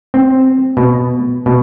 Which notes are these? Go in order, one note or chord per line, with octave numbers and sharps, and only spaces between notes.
C4
B2
B2